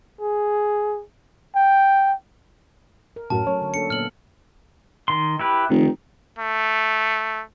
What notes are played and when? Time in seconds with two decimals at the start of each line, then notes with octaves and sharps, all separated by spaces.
0.20 G#4
1.55 G5
3.16 A#4
3.30 F#2 A2 C#4 F#4 A#4 A5
3.47 F#3 A3 C#4 C#5
3.62 D3
3.74 A#3 D4 A4 C#7
3.90 A#2 A#3 B3 F6 F#7
5.08 D#3 C6
5.39 E4 G4 B4
5.70 F1 D#3
6.38 A3